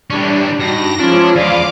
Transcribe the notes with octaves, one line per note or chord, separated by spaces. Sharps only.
E3 G3 C#4 D4
G2 D#4 F#4 A#6
F3 G#3 C#4 D4 E4 F4
E2 B3 D5 F5 D6